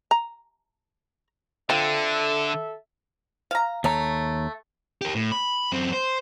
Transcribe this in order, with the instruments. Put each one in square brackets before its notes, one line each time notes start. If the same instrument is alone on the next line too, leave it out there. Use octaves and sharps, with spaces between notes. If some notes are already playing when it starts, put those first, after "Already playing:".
[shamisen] A#5
[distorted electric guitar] D3 [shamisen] C4 F4 [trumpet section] A4 E5
[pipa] F5 A#5
[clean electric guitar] D#2 C#5 A#5 [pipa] A3
[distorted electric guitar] G4 A#4
A2
B5
F#2 C4
C5